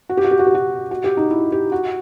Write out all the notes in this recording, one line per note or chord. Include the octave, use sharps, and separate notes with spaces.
F#4
G4
F#4
G4
F#4
G4
F#4
F#4
G4
D#4
E4
G4
F#4